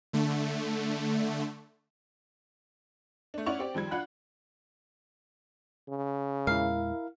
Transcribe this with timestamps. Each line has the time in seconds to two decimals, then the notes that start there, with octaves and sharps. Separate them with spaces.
0.13 D3 A3
3.34 A3 D4
3.46 C#4 E4 D5 F#5 C#6 F7
3.59 C4 G4 D5
3.74 D#2 F3 G3 G#6
3.91 D4 F4 F#5 B5 F#6
5.89 C#3
6.47 E2 A#2 G#3 E4 A#4 F5